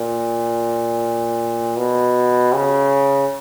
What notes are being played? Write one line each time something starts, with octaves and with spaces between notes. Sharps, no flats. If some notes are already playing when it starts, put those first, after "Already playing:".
Already playing: A#2
B2
C#3